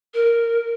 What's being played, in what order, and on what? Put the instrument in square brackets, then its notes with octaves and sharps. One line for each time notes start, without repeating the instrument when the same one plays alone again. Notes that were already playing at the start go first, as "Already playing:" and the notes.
[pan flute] A#4